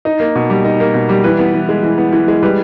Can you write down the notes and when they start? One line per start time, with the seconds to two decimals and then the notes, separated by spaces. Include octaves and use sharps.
0.05 D#4
0.20 A#3
0.35 B2
0.50 G3
0.64 D#4
0.80 A#3
0.94 B2
1.09 G3
1.24 E3 B4
1.39 B3
1.54 E3
1.69 G#3
1.83 E3
1.98 B3
2.13 E3
2.28 G#3
2.43 G3 B4